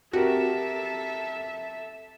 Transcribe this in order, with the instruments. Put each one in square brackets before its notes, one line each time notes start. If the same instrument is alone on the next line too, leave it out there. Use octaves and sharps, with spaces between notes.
[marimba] C4 [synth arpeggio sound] F#4 [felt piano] G4 A#4 [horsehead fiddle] A4 E5